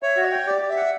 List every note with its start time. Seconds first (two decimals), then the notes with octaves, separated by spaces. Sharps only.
0.02 C#5 E5
0.17 F#4
0.24 C#5
0.32 G5
0.47 G4 D5
0.62 G4
0.69 E5
0.77 F#5